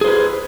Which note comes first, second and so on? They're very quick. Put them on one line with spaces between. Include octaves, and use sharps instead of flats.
G#4 C5 B4